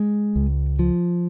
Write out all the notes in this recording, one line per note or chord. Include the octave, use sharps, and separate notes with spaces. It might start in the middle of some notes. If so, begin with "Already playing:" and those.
Already playing: G#3
C#2
F3